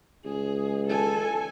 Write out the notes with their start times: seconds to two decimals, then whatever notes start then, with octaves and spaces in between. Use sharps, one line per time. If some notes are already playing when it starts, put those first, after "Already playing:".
0.25 C#2 G#4
0.87 A4 G#5